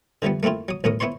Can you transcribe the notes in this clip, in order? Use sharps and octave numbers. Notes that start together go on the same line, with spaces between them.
D3 E3 F3 G3 B3
A3 A#3 C4 E4 F4
F#3 D#6
B1 A2 B3 A#4 D#6
B3 E4 C5 C#5 C6